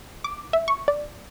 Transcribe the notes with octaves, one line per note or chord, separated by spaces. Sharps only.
D6
E5
C#6
D5